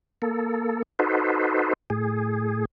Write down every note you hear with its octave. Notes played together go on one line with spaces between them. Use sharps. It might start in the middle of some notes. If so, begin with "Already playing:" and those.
A#3 A4
D#4 F#4 A4 B4 C5
A2 G#4